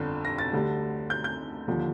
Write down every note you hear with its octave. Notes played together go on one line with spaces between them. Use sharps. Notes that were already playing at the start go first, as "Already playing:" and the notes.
Already playing: G1 F2 D3
A#6
A6
D2 D3 G3
G6
G6
D#2 D3 F3